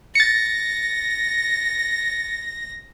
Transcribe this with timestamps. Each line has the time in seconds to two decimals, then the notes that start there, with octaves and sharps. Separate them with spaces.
0.15 A6 A#6 C#7